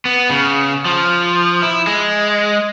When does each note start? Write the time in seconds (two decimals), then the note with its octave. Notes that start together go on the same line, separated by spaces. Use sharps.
0.05 B3
0.30 C#3
0.86 F3
1.62 E4
1.87 G#3